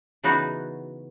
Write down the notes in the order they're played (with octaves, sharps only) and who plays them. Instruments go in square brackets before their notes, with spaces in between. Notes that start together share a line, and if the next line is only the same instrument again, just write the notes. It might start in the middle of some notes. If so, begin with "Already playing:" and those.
[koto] C#3 E3 B3 D#4 F#4